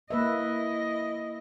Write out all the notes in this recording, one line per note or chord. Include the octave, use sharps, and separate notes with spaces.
A#3 E4 B4 D#5 E5